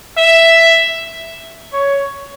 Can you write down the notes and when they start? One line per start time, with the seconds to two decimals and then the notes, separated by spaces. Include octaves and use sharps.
0.17 E5
1.73 C#5